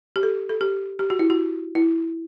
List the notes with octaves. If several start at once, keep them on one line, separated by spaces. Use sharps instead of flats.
G4
A4
A4
G4
G4
F#4
E4
F#4
E4